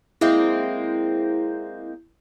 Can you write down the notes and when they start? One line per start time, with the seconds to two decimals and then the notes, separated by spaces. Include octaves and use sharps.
0.21 G#3 A#3 C4 E4 G6